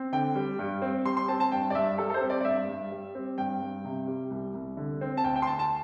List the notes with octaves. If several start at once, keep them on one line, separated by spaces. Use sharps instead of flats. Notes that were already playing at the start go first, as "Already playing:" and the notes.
Already playing: C4
D3 G5
G3
G2
C4
G3 C6
C6
C4 A5
A5
G2 G5
D5
G2 E5
G3 A4
A4
C5
C4
D5
D5
G2 E5
G2
G3
C4
G2 G5
G2
C3
G3
C2
C2
D3
C4
A5
D2 G5
G5
C6
D2 A5
A5